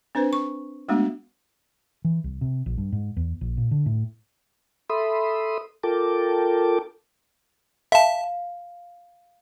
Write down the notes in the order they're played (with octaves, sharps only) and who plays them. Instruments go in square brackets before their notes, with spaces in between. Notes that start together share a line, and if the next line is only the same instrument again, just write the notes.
[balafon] C4 D4 B4 C5
C#6
G#3 A3 B3 D4 F#4
[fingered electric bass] E3
C2
C3
A#1
G2
G#2
E2
A#1
A#2
D3
A2
[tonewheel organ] A4 E5 B5 C6 D#6
F4 A4 A#4 G5 A5 D6
[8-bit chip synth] E5 A5 [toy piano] F5